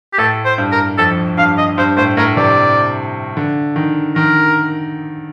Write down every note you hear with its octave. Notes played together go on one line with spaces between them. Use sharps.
G4
A2 A4
C5
G2
A#4
F2 A4
G2 F5
D#5
G2 C5
A2 C5
A2 A#4
C3 D5
D3
D#3
D#3 A#4